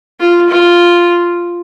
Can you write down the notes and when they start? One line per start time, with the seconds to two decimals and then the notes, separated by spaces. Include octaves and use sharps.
0.20 F4
0.49 F4